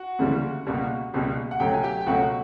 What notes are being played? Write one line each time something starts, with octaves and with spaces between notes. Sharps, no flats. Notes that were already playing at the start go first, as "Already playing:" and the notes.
Already playing: F#4 F#5
D2 C#3 E3 G3 A#3
C#2 B2 G3 A#3
C#2 B2 G3 A#3
F#5
C#2 B2 F#3 A3 G4 G5
G#5
G4 G5
G5
C#2 B2 F#3 A3 F#4 F#5